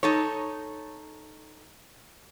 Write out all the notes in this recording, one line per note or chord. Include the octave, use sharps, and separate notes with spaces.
D#4 A4 C#5